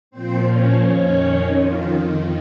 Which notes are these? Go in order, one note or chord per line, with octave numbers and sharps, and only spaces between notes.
A#2 F3 C4 C5
C#4 C#5
F2 D#3 C#4 C#5
F2 D#3 F4